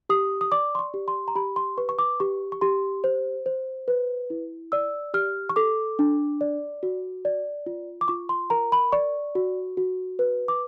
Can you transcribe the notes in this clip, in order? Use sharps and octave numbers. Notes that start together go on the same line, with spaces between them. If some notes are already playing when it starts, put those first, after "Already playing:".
G4 D#6
D#6
D5 D6
C6
C#6
G4
C6
A#5
G4 B5
C6
B4 C#6
C#6
D6
G4 C#6
C#6
G4 C6
C5
C5
B4
E4
D5 E6
G4 F6
C#6
A4 D6
D4
D5
F#4
D5
F4
D6
F4 C#6
C6
A#4 A#5
B5
D5 C#6
F#4
F#4
B4
D6